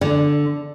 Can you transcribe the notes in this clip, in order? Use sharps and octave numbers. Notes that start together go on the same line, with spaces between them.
D3